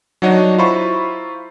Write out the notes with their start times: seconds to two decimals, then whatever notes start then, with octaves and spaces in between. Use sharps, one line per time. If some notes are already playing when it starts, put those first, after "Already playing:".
0.22 F#3 D4 D#4 F#4 C#5 D#5
0.58 E4 F4 C5 A#5 B5 C#6